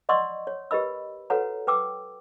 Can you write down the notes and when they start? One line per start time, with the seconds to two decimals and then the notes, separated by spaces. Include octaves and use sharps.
0.09 D5 D#5 F#5 C6 C#6 E6
0.47 C#5
0.71 G4 A#4 B4 D#5 B5 E6
1.30 F#4 A4 B4 C#5 F#5 A#5
1.67 B4 G5 D6 E6